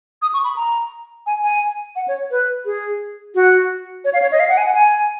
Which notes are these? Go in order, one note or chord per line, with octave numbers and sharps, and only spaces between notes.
D#6
C#6
B5
A#5
G#5
G#5
F#5
C#5
B4
G#4
F#4
C#5
F5
C#5
D#5
F5
F#5
G#5
F#5
G#5